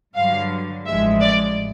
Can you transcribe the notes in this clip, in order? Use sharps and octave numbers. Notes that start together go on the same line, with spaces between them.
G2 D3 F#3 F5
A1 A2 F3 G#3 E5
D5